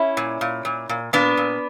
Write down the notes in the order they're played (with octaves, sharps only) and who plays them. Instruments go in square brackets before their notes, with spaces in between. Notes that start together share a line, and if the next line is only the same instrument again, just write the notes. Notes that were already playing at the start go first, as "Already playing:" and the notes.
Already playing: [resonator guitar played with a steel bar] C#4 E4
A#2
A#2
A#2
A#2
A#2 B3 D4
A#2